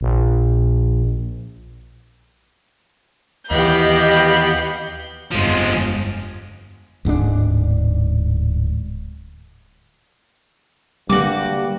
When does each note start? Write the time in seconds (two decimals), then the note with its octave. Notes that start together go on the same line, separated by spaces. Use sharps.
0.01 A#1
3.51 D#2 E3 B3 G4 D#5 F5 B5 G6
5.31 G1 F2 F3 G#3
7.05 D1 G#2 G3 D4
11.09 G2 D3 G3 A3 A#3 F#4 G4 D6